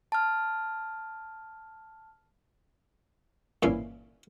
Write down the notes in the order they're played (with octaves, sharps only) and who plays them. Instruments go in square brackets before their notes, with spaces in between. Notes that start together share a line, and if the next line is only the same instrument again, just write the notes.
[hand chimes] A5 F6
[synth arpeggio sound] G1 E4 C7 [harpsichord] A#2 E3 C#4